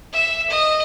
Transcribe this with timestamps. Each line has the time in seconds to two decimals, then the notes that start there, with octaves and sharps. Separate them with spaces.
0.13 E5
0.50 D#5